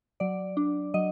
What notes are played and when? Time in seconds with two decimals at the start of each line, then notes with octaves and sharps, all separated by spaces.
0.20 F#3 D5
0.57 D4
0.94 F#3 D#5